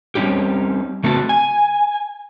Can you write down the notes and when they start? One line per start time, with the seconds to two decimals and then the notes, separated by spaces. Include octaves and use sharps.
0.15 G3 C4 C#4 D#4 G4
1.04 C#3 A3 C4 F#4 A5
1.29 G#5